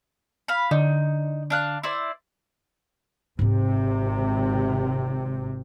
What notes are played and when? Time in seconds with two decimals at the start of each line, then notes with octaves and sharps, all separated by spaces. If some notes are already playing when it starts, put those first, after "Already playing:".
0.48 F5 B5
0.71 D3 D#4
1.50 D4 F5 F#6
1.83 E4 C5 D5
3.39 G#1 G#2 C3 C4